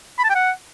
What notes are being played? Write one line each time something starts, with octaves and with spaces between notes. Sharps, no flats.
B5
A5
G5
F#5